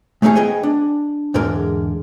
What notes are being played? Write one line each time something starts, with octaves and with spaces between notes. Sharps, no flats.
G#3 A3 C#4 D#4 G#4
B3 G#4 D#5 G5 G#5
D4
E2 G#2 D3 G#3 A#4